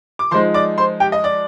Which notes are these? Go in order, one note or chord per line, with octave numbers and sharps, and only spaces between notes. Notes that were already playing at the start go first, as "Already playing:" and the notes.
D6
F3 G#3 D#4 C5 C6
D5 D6
C5 C6
G4 G5
D#5
D5